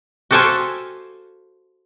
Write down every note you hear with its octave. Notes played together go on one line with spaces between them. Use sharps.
F#4 G4 A4 C5 F5 G#5